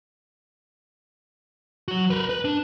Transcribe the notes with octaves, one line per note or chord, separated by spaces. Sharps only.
F#3 F#4
A#4 B4
B4
D4